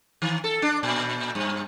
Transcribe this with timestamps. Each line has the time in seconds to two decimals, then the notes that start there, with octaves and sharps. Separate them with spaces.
0.22 D#3
0.44 A4
0.62 D4
0.83 A#2
1.35 G2